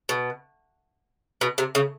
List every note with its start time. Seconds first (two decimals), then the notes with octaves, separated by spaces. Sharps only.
0.09 B2
1.41 B2
1.58 C3
1.75 C#3